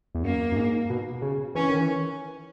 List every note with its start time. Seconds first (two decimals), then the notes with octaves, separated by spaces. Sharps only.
0.15 E2
0.23 F#2 A#3
0.52 F#2
0.56 G#2
0.90 B2
1.22 C#3
1.55 E3 C#4
1.69 D#3
1.79 E3